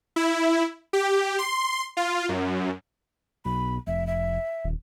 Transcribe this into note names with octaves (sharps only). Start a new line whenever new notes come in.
E4
G4
C6
F4
F#2
B1 B5
F1 E5
E5
D#1